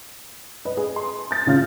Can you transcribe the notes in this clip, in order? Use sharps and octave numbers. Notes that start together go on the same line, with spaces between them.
B4 D#5
G#4
C6
G6 A6
A2 C#3 F4 F6